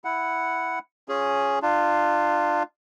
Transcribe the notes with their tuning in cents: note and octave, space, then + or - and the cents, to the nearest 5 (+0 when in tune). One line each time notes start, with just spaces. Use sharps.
E4 +0 F#5 +0
C#4 +0 F4 +15 G#4 +0
D4 +30 F4 +0